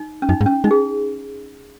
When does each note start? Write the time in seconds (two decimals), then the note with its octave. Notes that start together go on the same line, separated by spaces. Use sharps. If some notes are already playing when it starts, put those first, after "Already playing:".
Already playing: D#4
0.22 C#4
0.29 F#2 D#4
0.41 G#2
0.46 C#4
0.64 G#3 D#4
0.71 G#4